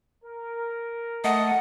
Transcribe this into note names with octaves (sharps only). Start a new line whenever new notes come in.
A#4
A3 D#5 F#5